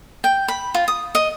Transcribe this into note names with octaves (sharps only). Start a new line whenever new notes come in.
G5
B5
F4
D#6
D#5